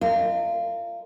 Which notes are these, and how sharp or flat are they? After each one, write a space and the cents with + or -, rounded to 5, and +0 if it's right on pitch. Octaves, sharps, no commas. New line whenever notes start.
F4 -25 A#4 -40 D#5 +0